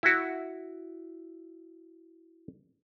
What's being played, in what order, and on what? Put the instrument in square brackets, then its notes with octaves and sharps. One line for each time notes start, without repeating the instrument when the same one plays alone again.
[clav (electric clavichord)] E4 F#4